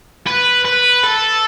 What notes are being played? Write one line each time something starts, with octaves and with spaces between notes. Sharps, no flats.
B4
B4
A4